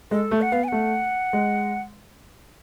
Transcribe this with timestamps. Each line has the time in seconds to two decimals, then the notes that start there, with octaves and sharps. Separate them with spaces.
0.11 G#3 A4
0.31 A3
0.41 F#5
0.52 B3 F5
0.64 G#5
0.68 A3 F#5
1.33 G#3